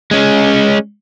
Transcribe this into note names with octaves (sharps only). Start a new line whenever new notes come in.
G#3 C#4